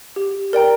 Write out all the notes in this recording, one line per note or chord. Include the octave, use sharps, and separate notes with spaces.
G4
A#4 D5 G5 A#5